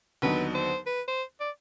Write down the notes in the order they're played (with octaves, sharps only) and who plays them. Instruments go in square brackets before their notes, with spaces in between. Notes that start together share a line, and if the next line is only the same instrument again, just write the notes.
[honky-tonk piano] D#2 D3 F#3 B3 D#4 [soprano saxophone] B4
[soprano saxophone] C5
B4
C5
D5